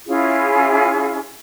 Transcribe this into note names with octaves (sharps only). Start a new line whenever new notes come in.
C#4 E4 F4 G#4